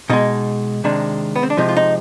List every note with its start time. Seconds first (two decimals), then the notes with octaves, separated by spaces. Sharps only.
0.10 B2 G#3 D#4
0.84 C3 D#3 G#3 D4
1.36 B3
1.43 C4
1.50 D4
1.57 C3 F3 G#3 D#4
1.69 F4
1.77 D#4